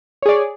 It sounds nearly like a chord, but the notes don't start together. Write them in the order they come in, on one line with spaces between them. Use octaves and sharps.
C#5 G#4 D5